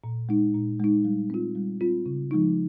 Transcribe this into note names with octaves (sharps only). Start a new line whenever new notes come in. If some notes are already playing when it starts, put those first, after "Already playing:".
A#2
G#3 D#4
A#2
G#3 D#4
G3
C4 F4
G3
C4 F4
C#3
F3 G#3 D#4